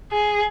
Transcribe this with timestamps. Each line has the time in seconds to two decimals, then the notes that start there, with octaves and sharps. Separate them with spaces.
0.12 G#4